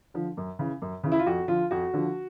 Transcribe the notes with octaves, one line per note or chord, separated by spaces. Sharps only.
D3 F3
F#2
C#3 E3
F#2
C#3 E3
E4
F4
F2 F#4
D3 F3 F4
F2 F#4
D3 F3